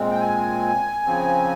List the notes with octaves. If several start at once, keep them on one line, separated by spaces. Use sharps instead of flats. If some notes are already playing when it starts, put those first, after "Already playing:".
Already playing: A#2 G#3 C4
G5
G#5
C#3 F3 C4